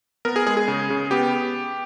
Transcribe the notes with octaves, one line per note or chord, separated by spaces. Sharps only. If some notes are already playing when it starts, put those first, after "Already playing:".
B3 A#4
G#4
G#3 G#4
G#4
C#3
C#3
B3 G4